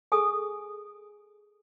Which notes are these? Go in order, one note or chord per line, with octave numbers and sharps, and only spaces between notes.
G#4 A4 G#5 D#6